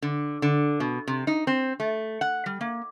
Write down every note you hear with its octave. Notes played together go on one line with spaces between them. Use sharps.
D3
D3
B2
C3
D#4
C4
A3
F#5
G3
A#3